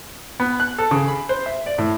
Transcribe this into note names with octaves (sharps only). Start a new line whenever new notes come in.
B3
F#6
A4
C#3
B5
C5
E5
D5
A2